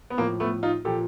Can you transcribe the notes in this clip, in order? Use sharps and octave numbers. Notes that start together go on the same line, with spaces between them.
B3
A2 F3 A#3
A3 B3
D#4 F4
A#2 F3 G4 A4